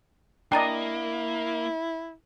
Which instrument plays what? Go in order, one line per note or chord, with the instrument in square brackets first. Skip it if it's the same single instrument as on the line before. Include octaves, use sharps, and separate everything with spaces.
[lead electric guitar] A#3 [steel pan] D4 D#5 [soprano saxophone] E4 [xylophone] G5 A#5 A6